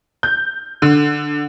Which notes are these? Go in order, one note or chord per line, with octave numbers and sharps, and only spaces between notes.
G6
D3